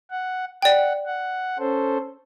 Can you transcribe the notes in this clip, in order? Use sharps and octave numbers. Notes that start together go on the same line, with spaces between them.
F#5
D5 F#5 G5
F#5
C#4 A4 C5